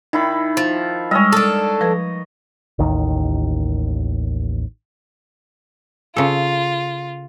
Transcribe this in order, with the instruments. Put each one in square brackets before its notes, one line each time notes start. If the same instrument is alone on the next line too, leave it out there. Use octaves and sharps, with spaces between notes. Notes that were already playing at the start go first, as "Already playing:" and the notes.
[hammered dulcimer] D#3 E4 B5 [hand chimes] D#4
[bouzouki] F3
[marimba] G3 G#3 [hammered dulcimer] C#5 D#5 [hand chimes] E6 F6
[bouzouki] D4 A4
[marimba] F3 B4 G#6 [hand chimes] A#6
[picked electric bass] A1 D#2 D#3
[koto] C#3 A4 [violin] F4